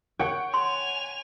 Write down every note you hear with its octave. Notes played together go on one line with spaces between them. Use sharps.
C#5 F#5 G5
G#5 C6 F7